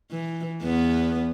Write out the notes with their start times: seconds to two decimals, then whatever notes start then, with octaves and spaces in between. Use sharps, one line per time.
0.11 E3
0.62 E2 B3